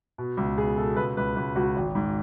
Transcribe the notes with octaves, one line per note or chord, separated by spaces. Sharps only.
B2
C#2
B2 G#4
B2 A4
C#2 B4
C#2 B4
C#2 B4
C#2 F#4
G#1
G#2